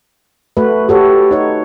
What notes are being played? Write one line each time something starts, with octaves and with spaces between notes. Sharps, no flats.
A3 F#4 B4
F#4 G4 A4 C#5
D#4 C#5